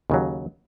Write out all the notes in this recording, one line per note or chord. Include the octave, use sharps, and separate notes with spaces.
D#2 C#3 F#3